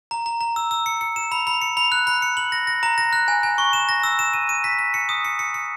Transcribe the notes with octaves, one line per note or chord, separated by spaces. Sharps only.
A#5
A#5
A#5
E6
E6
C#7
C#7
E7
B5
B5
C#7
B5
F#6
B5
C#7
F#7
A#6
A#6
A#5
A#6
F#6
G#5
G#5
C#6
E7
A#6
E6
E7
D#7
D#7
B6
B6
C#7
D#6
C#7
C#7
C#7